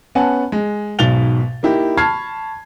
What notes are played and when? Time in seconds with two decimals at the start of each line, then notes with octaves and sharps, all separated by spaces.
0.15 B3 C#4 F#5 G#5 A5
0.52 G#3
0.99 B1 G#2 B2 A6 F7 G7
1.63 A#3 D#4 E4 G4
1.97 A5 B5 C#6 F6 G#6 C7